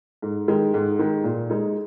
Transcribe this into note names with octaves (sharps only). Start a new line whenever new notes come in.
G#2
D#3 G#3
G#2
D#3 G#3
A#2
G#3 D#4